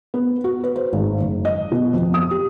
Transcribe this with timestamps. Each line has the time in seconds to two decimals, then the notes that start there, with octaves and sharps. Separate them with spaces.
0.14 B3
0.44 F#4
0.64 B4
0.76 C5
0.93 G#1
1.21 F#1
1.45 D#5
1.72 B2
1.93 F2
2.14 D#6
2.31 G4